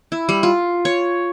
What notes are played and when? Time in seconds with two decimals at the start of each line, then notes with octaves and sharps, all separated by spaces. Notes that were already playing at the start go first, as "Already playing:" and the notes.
0.12 E4
0.29 G3
0.43 F4
0.85 C#5